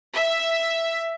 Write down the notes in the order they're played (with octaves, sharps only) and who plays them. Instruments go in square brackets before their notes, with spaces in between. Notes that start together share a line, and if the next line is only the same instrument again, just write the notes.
[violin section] E5